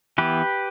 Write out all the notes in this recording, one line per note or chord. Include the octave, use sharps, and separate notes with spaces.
E3 B3 G4 B4